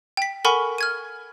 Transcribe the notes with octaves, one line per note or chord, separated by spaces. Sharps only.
G5 B6
A4 A#4 F#5 G#5 B5 C#6
F6 G#6 D#7